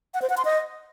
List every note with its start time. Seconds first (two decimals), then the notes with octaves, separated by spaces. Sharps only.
0.14 F#5
0.22 C5
0.30 F#5
0.37 C6
0.45 D#5